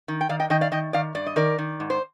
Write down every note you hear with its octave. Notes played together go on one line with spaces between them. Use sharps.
D#3
G5
D#3 D5 F5
D#5 G5
D#3 D#5 G5
D5 F5
D#3 D#5 G5
D#3 D5 F5
G2 D5
D#5
D#3 A#4 D5
D#3
G#2
C5